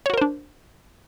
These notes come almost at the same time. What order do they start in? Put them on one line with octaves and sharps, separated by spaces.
C#5 F#4 A#4 C5 D4